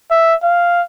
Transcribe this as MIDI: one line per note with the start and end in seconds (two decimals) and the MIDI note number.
0.11 0.35 76
0.43 0.82 77